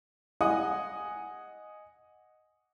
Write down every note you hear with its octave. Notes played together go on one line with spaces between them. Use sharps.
D#5 F#5 G#5 D#6